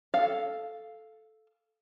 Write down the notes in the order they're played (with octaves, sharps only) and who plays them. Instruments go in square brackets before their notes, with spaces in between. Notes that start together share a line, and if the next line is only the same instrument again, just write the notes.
[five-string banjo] A4 F5